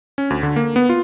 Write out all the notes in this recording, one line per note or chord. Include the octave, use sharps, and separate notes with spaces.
C#4
D2
D3
A#3
B3
F4